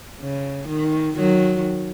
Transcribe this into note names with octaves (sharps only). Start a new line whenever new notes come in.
C#3
D#3
D#3 F#3